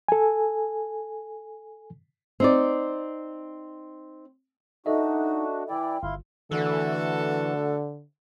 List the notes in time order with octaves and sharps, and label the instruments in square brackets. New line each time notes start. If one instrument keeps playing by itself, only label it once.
[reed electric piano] A4 G#5
[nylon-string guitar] C4 D#4 D5
[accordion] D4 F#4 [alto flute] D#4 [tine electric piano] A4 D#5 E5
[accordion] E3 E4 D5 [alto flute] G5
[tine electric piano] G1 [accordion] E4 F5 C6
[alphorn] D3 [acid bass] E3 [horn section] A3 F#4 A4